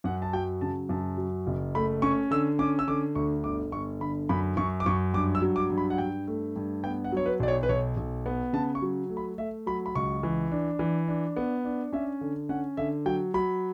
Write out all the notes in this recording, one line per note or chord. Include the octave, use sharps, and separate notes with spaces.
F#2 F#5
A5
F#3 G5
C#3 A5
F#2 A5
F#3
F#1
A3 B5
C#4 C#6
D3 E6
C#4 D6
E6
D3 D6
D2 C#6
G1 D6
G1 C#6
D3 B5
F#2 B5
F#2 C#6
D6
F#2 C#6
G2 D6
E6
F#3
D6
G2
B5
F#5
G2 G5
A3
G2
B3 G5
F#5
F#3 C#5
B4
B1 D5
C#5
B4
B1 C#5
B1
B3
C#3 A5
C#6
F#3
A3
B5
A3 E5
F#3 B5
B5
C#2 C#6
E3
D4
E3
D4
B3
D4
C#4 E5
D3
C#4 F#5
D3 E5
F#3 G5
F#3 B5